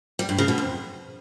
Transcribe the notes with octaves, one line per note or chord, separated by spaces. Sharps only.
G3
G2
C#3
B2
F2